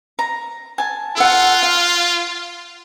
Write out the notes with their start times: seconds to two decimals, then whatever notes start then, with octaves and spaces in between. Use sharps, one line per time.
0.19 A#5
0.78 G#5 A5
1.17 F4 A4 F#5
1.62 F5